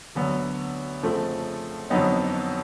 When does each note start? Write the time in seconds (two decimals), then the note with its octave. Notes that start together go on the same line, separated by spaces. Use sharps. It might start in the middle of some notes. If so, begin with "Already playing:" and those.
0.15 D2 D3 F#3 B3
1.03 F2 C#3 F3 A3
1.90 F2 D3 F#3 B3 D#4